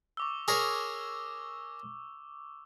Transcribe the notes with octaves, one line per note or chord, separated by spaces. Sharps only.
C#6 D6 E6
G#4 A#4 C#5